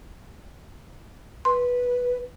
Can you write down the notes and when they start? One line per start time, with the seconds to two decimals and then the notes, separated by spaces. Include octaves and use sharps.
1.45 B4 C6